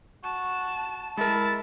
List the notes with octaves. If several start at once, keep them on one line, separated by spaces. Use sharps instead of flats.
F#4 A5
G#3 E4 A#4 A5